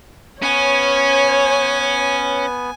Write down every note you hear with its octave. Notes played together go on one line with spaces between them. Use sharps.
B3 C#4 B4 C#5 G#5